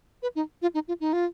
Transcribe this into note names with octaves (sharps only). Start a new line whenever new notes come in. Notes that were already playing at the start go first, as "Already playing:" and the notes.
B4
D#4
F4
D#4
F4
D#4
F4